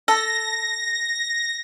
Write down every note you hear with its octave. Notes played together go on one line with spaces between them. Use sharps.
A4 A#6